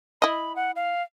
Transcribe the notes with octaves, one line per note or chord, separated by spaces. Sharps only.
E4 D#5 B5
F#5
F5